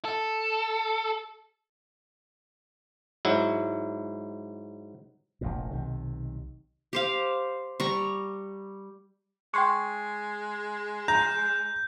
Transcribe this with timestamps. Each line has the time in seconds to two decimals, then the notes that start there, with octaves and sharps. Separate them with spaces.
0.05 A4
3.25 G#2 F#3 E4
5.41 F1 A#1 F2 A#2
5.71 B1 C3 D#3
6.93 G4 C5 F5
7.80 G3 A#5 C#6
9.54 G#3 G5 C6 C#6
11.08 A#5 G6